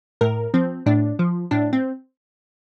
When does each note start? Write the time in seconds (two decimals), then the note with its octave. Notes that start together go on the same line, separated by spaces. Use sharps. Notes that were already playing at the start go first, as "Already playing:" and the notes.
0.21 A2 A#4
0.54 F3 C4
0.86 A2 D4
1.19 F3
1.51 A2 D4
1.73 C4